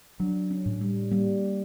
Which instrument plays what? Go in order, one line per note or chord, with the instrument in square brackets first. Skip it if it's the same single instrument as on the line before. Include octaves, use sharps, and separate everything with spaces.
[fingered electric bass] F#3 [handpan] D4
[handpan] C#4
[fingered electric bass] A2
[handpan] G3
[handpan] G3 [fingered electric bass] A#3